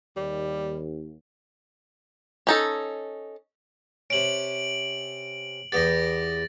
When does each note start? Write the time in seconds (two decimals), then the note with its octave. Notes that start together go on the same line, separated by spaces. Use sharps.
0.17 D#2 G3
2.47 C#4 D#4 A4
4.10 C3 C#4 D7 F#7
5.72 E2 B3 G4 A6 A#6